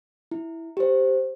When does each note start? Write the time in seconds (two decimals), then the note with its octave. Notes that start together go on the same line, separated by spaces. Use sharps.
0.31 E4
0.77 G4 C5